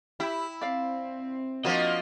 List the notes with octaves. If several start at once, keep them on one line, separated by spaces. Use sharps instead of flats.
E4 G4
C4 D5 F5
F3 A#3 D4 F4 F#4 D#5